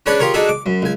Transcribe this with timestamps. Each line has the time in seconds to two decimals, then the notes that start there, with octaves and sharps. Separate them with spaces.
0.06 C#4 D4 G#4 B4 C#5 A5
0.19 F4 G4 G#4 A#4 C#5
0.34 D4 D#4 F#4 G#4 A4 E5
0.49 D6
0.66 F#2
0.82 C#2 G#5